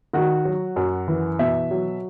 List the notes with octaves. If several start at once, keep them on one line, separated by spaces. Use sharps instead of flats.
D#3 F#4
F#3
F#2
E3
B2 E5
F#3